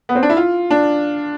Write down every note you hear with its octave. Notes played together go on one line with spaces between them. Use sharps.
B3
C4
D4
E4
F4
D4